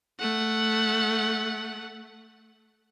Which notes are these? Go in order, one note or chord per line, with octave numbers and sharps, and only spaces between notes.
A3 F#5